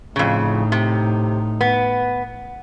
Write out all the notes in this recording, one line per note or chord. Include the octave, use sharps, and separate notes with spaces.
F2 A2 C#3 D#4
C3
B3